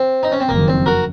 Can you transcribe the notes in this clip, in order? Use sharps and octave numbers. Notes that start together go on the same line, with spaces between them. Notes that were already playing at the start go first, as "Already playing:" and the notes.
Already playing: C4
D#4
C#4
C4
F#1 F2 D#3 A#3
C4
F#4 A#4